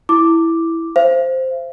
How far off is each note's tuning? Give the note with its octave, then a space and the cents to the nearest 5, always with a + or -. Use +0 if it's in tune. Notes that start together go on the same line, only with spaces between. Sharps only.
E4 +0 D6 +0
C5 +0 F5 -45